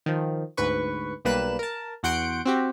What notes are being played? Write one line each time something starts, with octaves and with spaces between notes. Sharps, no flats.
D#3 F3
D2 G#2 B4 C#6
B1 G3 A#3 B4 F#6 E7
A#4 A5
E2 F#4 F#5 C6 G6 D7
C4 F#4 G4